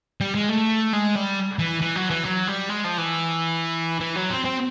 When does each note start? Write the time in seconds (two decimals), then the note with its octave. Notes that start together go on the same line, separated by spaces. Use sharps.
0.21 G3
0.35 G#3
0.49 A3
0.93 G#3
1.15 G3
1.59 E3
1.82 E3
1.96 F#3
2.10 E3
2.25 F#3
2.47 G3
2.69 G#3
2.84 F3
2.98 E3
4.00 E3
4.16 F#3
4.30 C4
4.45 C4